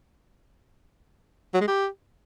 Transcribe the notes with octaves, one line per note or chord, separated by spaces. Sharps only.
F#3
G#3
G4